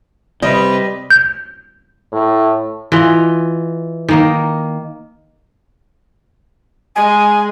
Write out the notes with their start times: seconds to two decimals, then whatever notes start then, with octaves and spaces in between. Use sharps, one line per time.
0.42 C3 G3 B4 D#5
1.10 G6
2.12 A2
2.92 E3 F4 D#5
4.08 D#3 A#3 D#5
6.96 G#3 G#5